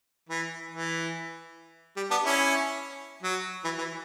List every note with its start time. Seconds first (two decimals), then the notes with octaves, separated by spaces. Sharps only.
0.29 E3
0.71 E3
1.97 G3
2.11 B3 D4
2.25 C#4 E4
3.23 F#3
3.65 E3
3.79 E3